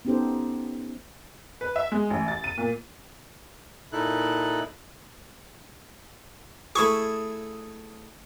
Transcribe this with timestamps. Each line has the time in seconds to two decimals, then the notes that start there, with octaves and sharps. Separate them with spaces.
0.05 B3 C#4 D#4 G4 A4 C5
1.61 B4
1.76 E5
1.92 G#3
2.10 A1
2.28 A6
2.44 D#7
2.58 A#2
3.92 A#2 D#4 E4 A4 F#6
6.75 A3 E4 G#4 C#6